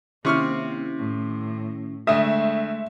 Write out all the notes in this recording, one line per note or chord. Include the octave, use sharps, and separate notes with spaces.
C3 D#3 A#3 C4 C#4 E4 C#6 F6
A2
D2 G#3 A3 E5 D#6